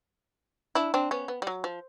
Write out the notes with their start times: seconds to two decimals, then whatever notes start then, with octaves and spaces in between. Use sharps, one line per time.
0.75 D4 E4
0.94 C4 D4
1.11 B3 C#4
1.28 B3
1.42 G3
1.47 F#3
1.64 F3